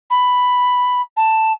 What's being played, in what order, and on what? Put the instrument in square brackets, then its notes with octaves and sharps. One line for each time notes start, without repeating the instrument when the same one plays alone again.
[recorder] B5
A5